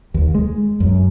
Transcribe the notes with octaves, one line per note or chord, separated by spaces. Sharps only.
D#2
G#3
F#2